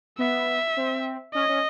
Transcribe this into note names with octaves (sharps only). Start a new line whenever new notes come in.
B3 E5
C4
C#4 D#5
C#4